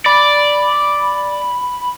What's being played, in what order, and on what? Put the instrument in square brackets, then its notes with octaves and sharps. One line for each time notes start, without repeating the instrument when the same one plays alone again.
[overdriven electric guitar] D5 [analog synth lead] B5